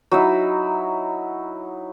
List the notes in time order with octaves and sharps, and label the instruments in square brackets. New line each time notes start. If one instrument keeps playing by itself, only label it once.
[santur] F#3 D#4 E4